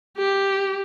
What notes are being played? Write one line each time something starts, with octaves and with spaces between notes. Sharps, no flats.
G4